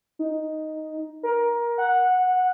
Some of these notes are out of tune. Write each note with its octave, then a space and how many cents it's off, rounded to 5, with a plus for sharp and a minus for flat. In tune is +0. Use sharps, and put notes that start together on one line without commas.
D#4 +5
A#4 +20
F#5 -10